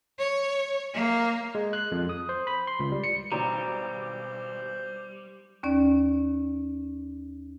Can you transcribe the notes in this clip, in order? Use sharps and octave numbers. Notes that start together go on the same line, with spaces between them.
C#5
A#3
G#3
F#6
F2
D#6
C5
B5
C6
C#2
G3
C#7
G#1 B2 G3 D4 F#4 C5 C#5 A#5
D#2 C#4 D5